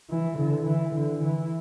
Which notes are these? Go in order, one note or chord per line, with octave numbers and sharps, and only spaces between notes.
E3
D3
E3
D3
E3